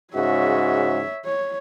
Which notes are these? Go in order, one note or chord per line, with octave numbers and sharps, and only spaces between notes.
G#2 C#3 F#4 C#5 E5
C#5